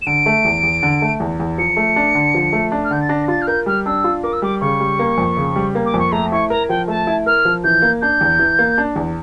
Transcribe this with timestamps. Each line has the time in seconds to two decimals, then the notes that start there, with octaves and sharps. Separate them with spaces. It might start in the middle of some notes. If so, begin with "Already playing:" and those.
0.02 E7
0.06 D3 D7
0.26 A3
0.45 E2
0.63 E2
0.83 D3
1.02 A3
1.20 E2
1.40 E2
1.58 F3 C#7
1.77 A3
1.96 D4
2.15 D3
2.34 F3
2.53 A3
2.72 D4
2.84 F6
2.91 D3 G6
3.01 A6
3.09 D4 A#6
3.28 F4 A6
3.42 F6
3.47 A#4 G6
3.66 G3 F6
3.85 D4 E6
4.04 F4
4.23 A#4 D6
4.33 E6
4.42 G3 D6
4.61 C#3 C#6
4.80 G3
4.99 A#3
5.18 F2
5.37 C#3
5.56 G3
5.75 A#3
5.85 D6
5.94 F2 C#6
6.12 A3 A#5
6.32 E4 C#6
6.50 A#4 A#5
6.69 F3 G5
6.88 A3 A5
7.07 E4
7.26 A#4 F6
7.45 F3
7.64 E3 G6
7.82 A#3
8.01 D4 G6
8.21 E2
8.39 E3
8.59 A#3
8.78 D4
8.96 E2